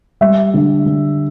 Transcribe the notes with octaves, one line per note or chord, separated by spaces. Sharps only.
G3 E5
D3
D3